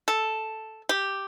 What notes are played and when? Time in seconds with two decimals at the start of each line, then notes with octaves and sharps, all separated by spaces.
0.08 A4
0.89 G4